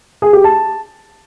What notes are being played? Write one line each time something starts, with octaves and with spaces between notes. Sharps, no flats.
G#4
G4
A5